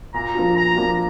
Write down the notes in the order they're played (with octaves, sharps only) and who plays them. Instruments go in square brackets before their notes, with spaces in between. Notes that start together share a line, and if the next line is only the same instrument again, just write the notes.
[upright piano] A#2 [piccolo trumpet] A#5
[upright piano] F3 A#3 D4 F4
[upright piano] A#2 [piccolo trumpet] A#5
[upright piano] F3 A#3 D4 F4